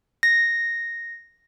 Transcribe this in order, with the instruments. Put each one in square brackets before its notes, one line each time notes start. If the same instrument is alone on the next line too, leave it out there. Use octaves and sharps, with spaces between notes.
[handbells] A#6